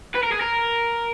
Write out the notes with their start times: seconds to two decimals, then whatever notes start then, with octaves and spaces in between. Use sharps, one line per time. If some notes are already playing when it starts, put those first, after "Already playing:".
0.15 B4
0.23 A#4
0.32 G#4
0.41 A#4